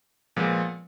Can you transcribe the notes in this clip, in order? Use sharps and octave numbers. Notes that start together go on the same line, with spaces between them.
A#2 F3 G#3 B3